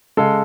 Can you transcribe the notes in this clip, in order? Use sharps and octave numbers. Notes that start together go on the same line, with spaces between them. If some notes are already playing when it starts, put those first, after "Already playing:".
C#3 G#3 A4